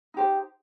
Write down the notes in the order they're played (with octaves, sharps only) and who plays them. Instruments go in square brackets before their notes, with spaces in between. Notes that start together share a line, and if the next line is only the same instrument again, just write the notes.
[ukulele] D#4 G4 C5